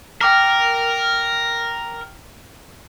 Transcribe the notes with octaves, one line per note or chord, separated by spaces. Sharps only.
A#4 G5 D6 F6